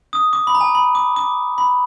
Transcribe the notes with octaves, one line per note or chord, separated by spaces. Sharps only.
D#6
D6
B5
A#5
G#5
B5
D6
D6
B5